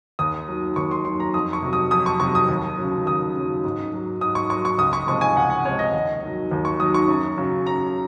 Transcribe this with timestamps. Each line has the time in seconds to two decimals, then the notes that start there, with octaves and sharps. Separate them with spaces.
0.19 D#2 D#6
0.48 D#3 F#3
0.76 D#2 C#6
0.91 C6
1.05 D#3 F#3 C6
1.20 A#5
1.34 F2 D#6
1.53 C#6
1.62 C3 F#3
1.73 D#6
1.91 F2 D#6
2.06 C#6
2.20 C3 F#3 C#6
2.35 D#6
2.49 D#2
2.78 C#3 F#3
3.06 D#2 D#6
3.35 C#3 F#3
3.64 G#2
3.93 F#3
4.21 G#2 D#6
4.35 C#6
4.50 F#3 C#6
4.65 C#6
4.78 C#2 D#6
4.93 C#6
5.07 C3 F3 G#3 C#6
5.21 G#5
5.36 C#2 F#5
5.50 F#5
5.65 C3 F3 G#3 C#5
5.79 D#5
5.93 D#2 D#5
6.23 D#3 F#3
6.51 D#2
6.65 C#6
6.80 D#3 F#3 D#6
6.94 C#6
7.08 F#2
7.38 C#3 F#3
7.66 F#2 A#5